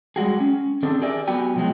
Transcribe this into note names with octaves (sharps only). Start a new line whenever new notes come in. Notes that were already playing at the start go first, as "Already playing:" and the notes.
G3 G#3 F#4 G#4
C#4
D#3 C4 D4 G#4 A4 C5
G4 G#4 A#4 D5 E5 G#5
F#3 B3 F#4 G4 G#5
B2 F3 F#3 G#3